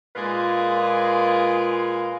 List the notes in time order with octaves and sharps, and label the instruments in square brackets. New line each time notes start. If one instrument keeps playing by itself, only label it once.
[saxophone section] A#2 G#3 F4 G#4 B4 F5